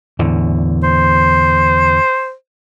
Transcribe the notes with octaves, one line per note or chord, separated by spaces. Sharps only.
E2 A2 D3
C5